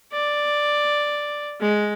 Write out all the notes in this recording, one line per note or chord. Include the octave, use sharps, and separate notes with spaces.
D5
G#3